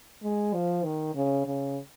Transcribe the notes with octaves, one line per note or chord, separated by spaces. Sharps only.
G#3
F3
D#3
C#3
C#3